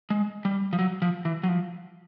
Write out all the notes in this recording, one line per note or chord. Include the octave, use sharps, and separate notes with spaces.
G#3
G3
F3
F#3
F3
E3
F#3
F3